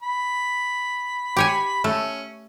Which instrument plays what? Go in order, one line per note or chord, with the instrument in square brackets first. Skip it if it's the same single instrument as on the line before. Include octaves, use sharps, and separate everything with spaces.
[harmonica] B5
[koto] G4 C#5 G#5
[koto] A3 [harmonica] C#4